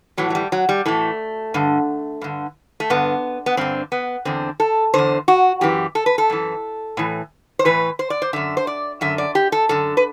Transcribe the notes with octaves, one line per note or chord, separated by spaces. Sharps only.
A2 E3 F#3
F#3
G3
F#3
G3
A2 E3 A3
G2 D3
G2 D3
A3
G2 D3 B3
B3
G2 D3 C4
B3
E2 D3 C4
A4
E2 D3 C5
F#4
F#2 E3 G4
A4
B4
A4
F#2 E3
A2 E3
C5
A2 E3 B4
C5
D5
C5
F#2 D3 E5
C5
D5
F#2 D3 E5
D5
G4
A4
F#2 D3 A4
B4